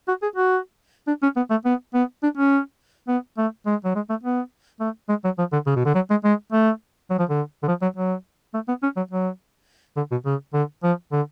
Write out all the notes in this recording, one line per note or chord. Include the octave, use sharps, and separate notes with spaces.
F#4
G#4
F#4
D4
C#4
B3
A3
B3
B3
D4
C#4
B3
A3
G#3
F#3
G#3
A3
B3
A3
G#3
F#3
F3
D3
C#3
B2
D3
F#3
G#3
G#3
A3
F#3
F3
D3
D3
F3
F#3
F#3
A3
B3
C#4
F#3
F#3
D3
B2
C#3
D3
F3
D3